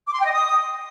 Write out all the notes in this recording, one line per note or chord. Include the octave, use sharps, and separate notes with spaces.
D6
C6
G5
D#5
D#6